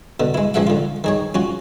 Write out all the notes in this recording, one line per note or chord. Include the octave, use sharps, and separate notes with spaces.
B2 D3
G#3 E4
C#2 F3 G#4 E5 F#5
D3 F4
D#3 G#4 C#5
C#4 F4 F#4